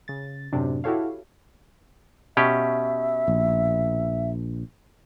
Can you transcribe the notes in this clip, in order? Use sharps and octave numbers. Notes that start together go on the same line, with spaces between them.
C#3 A6
F#2 A2 C3 D4
E4 F#4 G4 A4 C#5 F5
B2 C#4 G4 E5
A#1